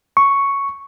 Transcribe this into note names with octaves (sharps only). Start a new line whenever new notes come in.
C#6